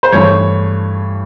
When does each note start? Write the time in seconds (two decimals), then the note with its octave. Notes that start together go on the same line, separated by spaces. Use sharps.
0.03 C5
0.12 G2 E3 A3 C#5